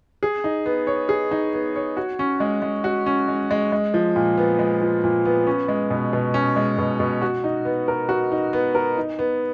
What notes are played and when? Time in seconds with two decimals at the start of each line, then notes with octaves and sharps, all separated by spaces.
0.23 G#4
0.44 D#4
0.66 B3
0.87 C#5
1.09 G#4
1.31 D#4
1.54 B3
1.76 C#5
1.97 F#4
2.19 C#4
2.40 G#3
2.62 G#3
2.84 F#4
3.06 C#4
3.28 G#3
3.51 G#3
3.72 G#3
3.94 F3
4.16 A#2
4.38 B3
4.59 G#3
4.81 F3
5.04 A#2
5.25 B3
5.47 C#4
5.68 G#3
5.90 B2
6.13 B2
6.34 C#4
6.56 G#3
6.78 B2
7.00 B2
7.22 F#4
7.44 D#4
7.65 B3
7.88 A#4
8.09 F#4
8.32 D#4
8.53 B3
8.75 A#4
8.97 D#4
9.19 B3